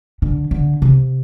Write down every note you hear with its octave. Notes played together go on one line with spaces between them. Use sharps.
D3
D3
C3